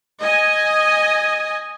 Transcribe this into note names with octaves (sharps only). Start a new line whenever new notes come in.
D#5 G#5